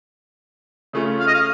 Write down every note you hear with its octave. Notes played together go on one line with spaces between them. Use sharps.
C#3 A3 C#4 F4
F5
D#5
F5